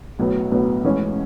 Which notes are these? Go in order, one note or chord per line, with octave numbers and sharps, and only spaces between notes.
B1 A2 F#3 B3
B1 A2 F#3 B3
A1 A2 E3 G#3 C#4